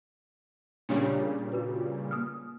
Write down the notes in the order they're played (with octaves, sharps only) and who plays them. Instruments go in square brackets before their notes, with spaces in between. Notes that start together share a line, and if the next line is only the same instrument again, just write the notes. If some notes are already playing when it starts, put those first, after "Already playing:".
[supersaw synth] A#2 C#3 G3 [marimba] D4 C#5
[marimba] F4 F#4 B4
A#3 D#6 F6